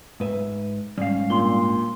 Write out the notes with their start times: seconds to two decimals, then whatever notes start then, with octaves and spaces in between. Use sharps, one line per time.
0.20 G#2 B4 E5
0.98 G#2 G3 C#4 F5
1.30 A#2 D4 C6 G7